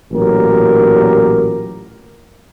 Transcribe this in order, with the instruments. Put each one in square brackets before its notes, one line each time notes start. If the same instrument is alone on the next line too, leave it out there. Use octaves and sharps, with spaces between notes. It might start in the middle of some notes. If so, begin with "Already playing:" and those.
[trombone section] A1 A#2 F#3 G4 A#4